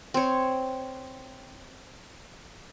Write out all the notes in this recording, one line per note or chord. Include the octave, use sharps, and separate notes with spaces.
C4 C#5